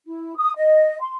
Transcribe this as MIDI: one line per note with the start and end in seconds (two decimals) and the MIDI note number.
0.06 0.34 64
0.37 0.52 87
0.56 0.99 75
1.01 1.15 84